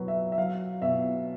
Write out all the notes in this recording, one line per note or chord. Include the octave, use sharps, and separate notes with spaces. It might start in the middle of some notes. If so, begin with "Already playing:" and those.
Already playing: B2 F#3 B4
E5
E5
F#3 F5
B2 E5